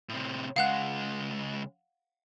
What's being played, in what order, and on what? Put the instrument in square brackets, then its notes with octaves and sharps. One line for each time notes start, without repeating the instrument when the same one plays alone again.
[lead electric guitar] A2 C3
[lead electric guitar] C#2 G#3 [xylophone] F5 F#5 F#6